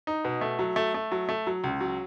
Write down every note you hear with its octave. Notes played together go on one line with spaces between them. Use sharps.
D#4
B2
A3
F#3
A3
A3
F#3
A3
F#3
C#2
F#3